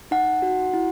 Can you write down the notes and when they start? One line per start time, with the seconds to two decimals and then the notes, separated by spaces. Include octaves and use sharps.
0.11 D#4 F#5
0.42 F#4
0.73 E4